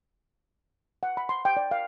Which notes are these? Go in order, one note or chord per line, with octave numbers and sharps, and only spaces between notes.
F#5
B5
C6
G5
D5
F5